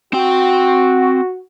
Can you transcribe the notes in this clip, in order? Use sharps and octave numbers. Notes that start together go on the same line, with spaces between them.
C4 F#4 G5